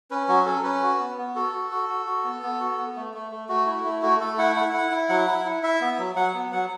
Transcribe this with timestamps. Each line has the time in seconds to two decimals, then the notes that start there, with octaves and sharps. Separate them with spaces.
0.11 C#4 B4
0.28 F#3 F#4
0.46 C#4 A4
0.64 C#4 B4
0.82 F#4
0.99 B3
1.18 B3
1.35 F#4 A4
1.53 F#4
1.71 F#4
1.89 F#4
2.06 F#4
2.24 B3
2.43 B3
2.60 F#4
2.78 B3
2.96 A3
3.14 A3
3.31 A3
3.49 A3 F#4
3.67 E4
3.84 A3
4.02 A3 F#4
4.20 A3 A4
4.38 E4 F#5
4.56 E4 F#5
4.73 E4
4.91 E4
5.09 F#3 F#5
5.28 E4
5.45 E4
5.63 E4 E5
5.81 B3
5.98 F#3
6.16 F#3 F#5
6.34 B3
6.52 F#3 F#5